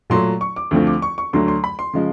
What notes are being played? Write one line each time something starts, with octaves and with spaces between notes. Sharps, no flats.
A#2 F#3 A3 C6
C#6
D6
D2 D3 F3 A3 C4
D6
C#6
C#6
D2 D3 F#3 A3 C6
C6
B5
C6
C#3 F3 G#3